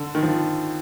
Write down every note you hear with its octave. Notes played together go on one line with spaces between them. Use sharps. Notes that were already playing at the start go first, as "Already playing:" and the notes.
Already playing: D3
D#3
F3